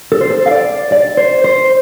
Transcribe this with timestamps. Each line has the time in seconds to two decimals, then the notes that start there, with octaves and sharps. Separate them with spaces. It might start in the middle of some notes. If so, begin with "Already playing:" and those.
0.12 A4
0.21 C5
0.30 A4
0.46 F5
0.51 D5
0.92 D5
1.17 C5
1.44 C5